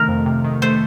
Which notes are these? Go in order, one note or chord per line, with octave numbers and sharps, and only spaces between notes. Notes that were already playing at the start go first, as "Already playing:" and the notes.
Already playing: C3 D#3 A3 A#4
F2
C3
D#3
A3 C5